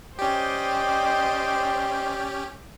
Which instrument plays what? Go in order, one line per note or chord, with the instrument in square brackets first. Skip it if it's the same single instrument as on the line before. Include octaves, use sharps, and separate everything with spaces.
[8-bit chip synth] C#4 G4 [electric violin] C5 D#5 [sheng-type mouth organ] D5 G5